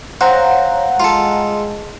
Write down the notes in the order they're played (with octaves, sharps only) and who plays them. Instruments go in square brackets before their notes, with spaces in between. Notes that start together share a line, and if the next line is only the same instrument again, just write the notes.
[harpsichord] C4 [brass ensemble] C#5 F5 [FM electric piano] F#5 A#5
[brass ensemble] G#3 [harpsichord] F4 A4